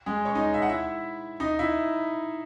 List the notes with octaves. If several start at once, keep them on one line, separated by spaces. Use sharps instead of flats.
G#3 G#4
C#4 C#5
D#4 D#5
E5
F#5
E4 E5
D#4 D#5
E4 E5